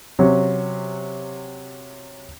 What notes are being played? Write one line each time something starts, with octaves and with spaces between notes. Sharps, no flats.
C3 F#3 C#4